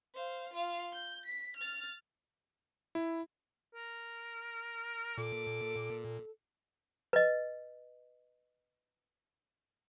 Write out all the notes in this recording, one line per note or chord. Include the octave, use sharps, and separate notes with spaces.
C5 F5
F4 F5
G6
B6
F6 A6
E4
A#4
A#2 A4 D6
B4 D#5